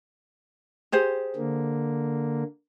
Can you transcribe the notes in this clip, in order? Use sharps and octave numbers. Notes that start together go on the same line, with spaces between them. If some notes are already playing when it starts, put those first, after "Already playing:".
G4 G#4 C5
D3 A#3